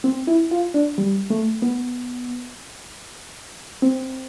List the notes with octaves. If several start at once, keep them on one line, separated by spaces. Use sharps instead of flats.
C4
E4
F4
D4
G3
A3
B3
C4